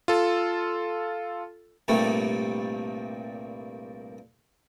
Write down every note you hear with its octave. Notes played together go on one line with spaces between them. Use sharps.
F4 A4
C2 G2 A#2 G3 A3